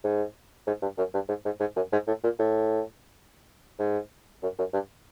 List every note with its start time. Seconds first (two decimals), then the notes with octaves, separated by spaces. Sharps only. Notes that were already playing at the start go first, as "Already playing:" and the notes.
0.04 G#2
0.67 G#2
0.82 G2
0.98 F#2
1.14 G2
1.29 G#2
1.45 G#2
1.60 G#2
1.76 F#2
1.92 G#2
2.08 A2
2.24 A#2
2.39 A2
3.80 G#2
4.43 F#2
4.59 F#2
4.74 G2